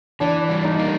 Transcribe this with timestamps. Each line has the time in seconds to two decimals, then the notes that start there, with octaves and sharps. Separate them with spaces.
0.20 E3 D4
0.49 G3
0.64 D#4
0.79 A#3